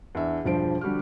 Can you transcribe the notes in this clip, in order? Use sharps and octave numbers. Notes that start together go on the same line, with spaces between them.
E2 D4 E5
E1 G2 F3 C5 D7
D3 G3 F#4 G4 F6